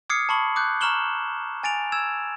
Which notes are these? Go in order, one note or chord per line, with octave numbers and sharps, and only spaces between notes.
D6 D#6 F6 G#6 C7 C#7
A5 B5 C#6 F#7
D6 F#6 G6
A#5 C#6 F6 E7 F#7 G7
G#5 A6 D7 F7
E6 G#6 E7